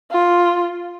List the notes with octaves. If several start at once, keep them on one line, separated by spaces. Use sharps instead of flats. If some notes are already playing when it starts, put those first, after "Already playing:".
F4